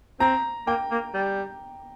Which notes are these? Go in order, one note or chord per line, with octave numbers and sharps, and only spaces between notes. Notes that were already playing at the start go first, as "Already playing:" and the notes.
C4 A#5
A#3 G5
A#3
G3